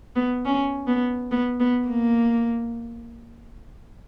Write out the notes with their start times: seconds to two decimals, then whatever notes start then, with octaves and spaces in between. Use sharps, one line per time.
0.16 B3
0.45 C#4
0.87 B3
1.31 B3
1.60 B3
1.88 A#3